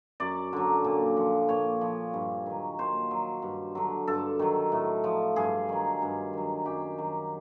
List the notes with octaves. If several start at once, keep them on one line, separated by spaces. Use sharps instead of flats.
F#2 D5
D3 F#3
A#2
F3
A#2 C#5
F3
G2
D#3 F#3
A#2 C5
F#3
G2
D3 F#3
G2 A4
D#3 F#3
A2
F3
G2 G#4
D#3 F#3
G2
D#3 F#3
F#2 G4
D#3 F#3